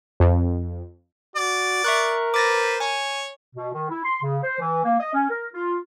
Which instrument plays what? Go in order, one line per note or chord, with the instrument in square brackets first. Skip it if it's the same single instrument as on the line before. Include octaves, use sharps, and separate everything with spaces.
[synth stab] F2
[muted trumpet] F#4 [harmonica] D5
[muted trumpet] A#4 [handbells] E5 C#6 F#6
[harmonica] B4 C5 [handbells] D6 A6 A#6
[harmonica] C#5 [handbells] G#5
[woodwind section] B2
D#3
E4
C6
C#3
C5
E3
A#3
D#5
C#4
A#4
F4